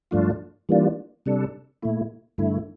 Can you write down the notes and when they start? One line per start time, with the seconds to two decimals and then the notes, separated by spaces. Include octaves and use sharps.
0.11 G2 F3 A3 D4 F4
0.69 E3 G3 A#3 D4 F4
1.26 C3 G3 D4 A4
1.82 A#2 A3 E4
2.38 G2 D3 A3 E4